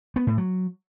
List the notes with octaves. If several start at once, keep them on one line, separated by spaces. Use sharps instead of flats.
B3
A2
F#3